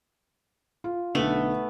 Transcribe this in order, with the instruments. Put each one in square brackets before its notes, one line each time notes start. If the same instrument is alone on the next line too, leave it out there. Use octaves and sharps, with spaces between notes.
[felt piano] F4
[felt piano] B1 D3 [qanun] A3 B3